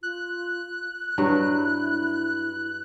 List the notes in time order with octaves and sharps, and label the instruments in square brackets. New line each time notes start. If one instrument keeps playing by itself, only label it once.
[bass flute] F4 [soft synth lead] F#6
[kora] G2 F#3 [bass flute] E4